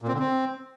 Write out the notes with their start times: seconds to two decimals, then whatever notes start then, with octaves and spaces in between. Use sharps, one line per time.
0.02 A#2
0.08 C4
0.14 D3
0.19 C4